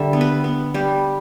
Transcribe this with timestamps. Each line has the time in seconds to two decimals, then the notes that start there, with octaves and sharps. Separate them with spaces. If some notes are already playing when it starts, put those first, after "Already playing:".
Already playing: D3 G3 E5
0.13 B3
0.21 B4
0.44 B3
0.74 G3 G4